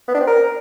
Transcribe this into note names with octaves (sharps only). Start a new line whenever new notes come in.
B3
D4
C4
A#4